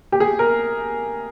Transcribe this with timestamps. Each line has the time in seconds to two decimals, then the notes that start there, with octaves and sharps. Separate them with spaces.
0.12 G4
0.20 G#4
0.39 A#4